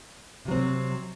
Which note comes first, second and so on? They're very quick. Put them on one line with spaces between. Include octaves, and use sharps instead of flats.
C3 F#3 C4